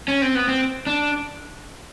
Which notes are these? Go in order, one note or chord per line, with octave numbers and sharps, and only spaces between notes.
C#4
C4
B3
C4
D4